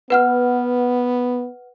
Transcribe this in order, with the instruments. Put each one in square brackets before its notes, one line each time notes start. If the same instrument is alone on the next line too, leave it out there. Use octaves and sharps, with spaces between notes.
[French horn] B3 [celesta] B4 F#5 F6